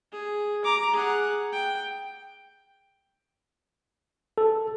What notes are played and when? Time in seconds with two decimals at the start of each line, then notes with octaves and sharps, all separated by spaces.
0.12 G#4
0.64 A#5 D6
0.94 G#4 F#5
1.52 G5
4.38 A4